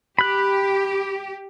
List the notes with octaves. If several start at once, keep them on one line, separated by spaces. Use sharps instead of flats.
G4 B5 F#6